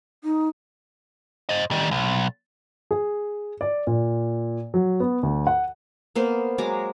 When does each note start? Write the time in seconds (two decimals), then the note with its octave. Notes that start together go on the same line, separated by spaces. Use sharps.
0.24 D#4
1.49 C5 D#5
1.71 D#3 G3
1.91 B1
2.91 G#4
3.61 D5
3.87 A#2
4.74 F#3
5.00 B3
5.23 D2
5.47 F#5
6.15 A#3 B3 C5
6.58 F#3 G#3 A#5 D6